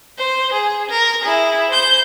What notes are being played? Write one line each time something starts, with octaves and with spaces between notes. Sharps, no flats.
C5
G#4
A#4
E4 G#4
C5 G6